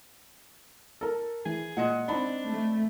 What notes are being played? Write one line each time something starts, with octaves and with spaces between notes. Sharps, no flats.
A4 A#4
E3 G#4
A#2 G#3 D#5 F#5
C4 D4 D#4 B5
A3